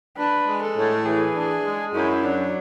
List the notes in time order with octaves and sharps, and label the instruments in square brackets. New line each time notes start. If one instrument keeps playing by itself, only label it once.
[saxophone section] D4 [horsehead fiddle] B4
[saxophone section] G#3
[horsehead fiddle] A4
[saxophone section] A2
[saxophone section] E3 [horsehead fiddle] G#4
[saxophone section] D4
G#3
[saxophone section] F#2 [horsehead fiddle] E4
[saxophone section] F#3 [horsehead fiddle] D4